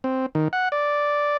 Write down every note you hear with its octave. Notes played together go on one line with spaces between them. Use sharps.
C4
D#3
F#5
D5